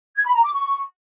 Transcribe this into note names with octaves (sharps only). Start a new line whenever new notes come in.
G#6
B5
A#5
D6
C#6